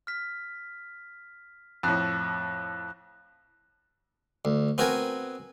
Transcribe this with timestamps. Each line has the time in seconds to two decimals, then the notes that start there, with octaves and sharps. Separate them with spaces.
0.07 F6 B6
1.83 F2 A2 E6 F#6
4.45 D2
4.78 B3 C4 F#4 A#4 G#5